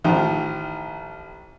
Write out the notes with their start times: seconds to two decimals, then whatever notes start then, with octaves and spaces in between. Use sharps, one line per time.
0.04 A1 D#3 F3